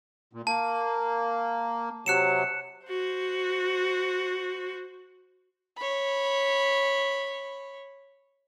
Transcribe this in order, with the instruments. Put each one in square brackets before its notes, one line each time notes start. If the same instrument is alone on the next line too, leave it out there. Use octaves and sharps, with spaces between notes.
[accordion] A#2
[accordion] A#3 [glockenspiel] A5
[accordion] C3 F#3 [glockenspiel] F#6 C#7 E7
[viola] F#4 C5
[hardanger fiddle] C#5 B5